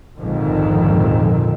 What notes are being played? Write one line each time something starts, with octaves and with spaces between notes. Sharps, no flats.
A#1 F2 G#2 D3 D#3 F3